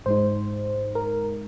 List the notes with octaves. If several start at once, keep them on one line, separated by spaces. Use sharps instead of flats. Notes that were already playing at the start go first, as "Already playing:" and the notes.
G#2 G#3 D#4 C5
A#4